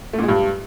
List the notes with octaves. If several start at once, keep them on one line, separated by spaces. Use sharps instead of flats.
A3
A#2
G#3
G2